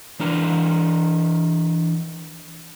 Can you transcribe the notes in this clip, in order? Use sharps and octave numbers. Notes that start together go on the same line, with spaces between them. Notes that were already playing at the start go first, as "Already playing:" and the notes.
E3 D4 A#5